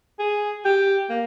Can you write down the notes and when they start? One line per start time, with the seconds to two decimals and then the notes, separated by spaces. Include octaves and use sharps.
0.19 G#4
0.65 G4
1.10 A#3